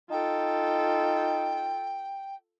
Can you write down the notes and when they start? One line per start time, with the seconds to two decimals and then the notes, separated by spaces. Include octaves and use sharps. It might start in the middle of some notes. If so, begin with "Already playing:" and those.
0.11 D#4 F4 A4 G5